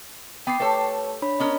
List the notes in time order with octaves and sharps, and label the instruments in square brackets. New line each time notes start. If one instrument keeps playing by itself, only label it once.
[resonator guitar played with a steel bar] B3 [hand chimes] G5 D6 C7
[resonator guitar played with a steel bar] A3 G4 A4 [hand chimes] B4 C#5 A5
[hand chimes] D4 C#5 B5
[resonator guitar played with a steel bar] B3 C#4 A#4 [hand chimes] D#5